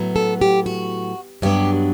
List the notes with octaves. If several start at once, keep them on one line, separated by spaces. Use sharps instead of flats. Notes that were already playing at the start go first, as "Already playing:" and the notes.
Already playing: A2 F#3 B3
A4
G4
F#4
G2 F#3 B3 D4 G4